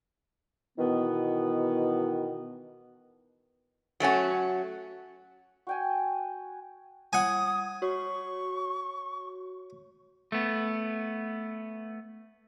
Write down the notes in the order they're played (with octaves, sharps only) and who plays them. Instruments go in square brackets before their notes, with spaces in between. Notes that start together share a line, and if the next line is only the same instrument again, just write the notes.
[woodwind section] B2 D#3 E3 B3
[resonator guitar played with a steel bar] F#3 A3 C#4 F#4
[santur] F#4 G5 G#5
[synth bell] G3 G#6 [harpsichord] F#5 G#5 [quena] D#6
[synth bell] F#4 C#5 [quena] C#6
[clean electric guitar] A3 B3